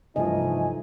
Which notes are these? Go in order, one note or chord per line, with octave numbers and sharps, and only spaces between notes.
C2 G2 E3 F3 A3 D#4 D#5 G#5